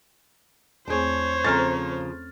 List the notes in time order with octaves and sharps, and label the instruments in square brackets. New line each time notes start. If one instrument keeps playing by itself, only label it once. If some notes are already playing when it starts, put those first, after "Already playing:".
[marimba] E2 A3 C4 [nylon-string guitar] D4 G#4 [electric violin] C5 C#5
[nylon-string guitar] C#3 F3 [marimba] C4 C#4 A4 [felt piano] A#5 F6 A6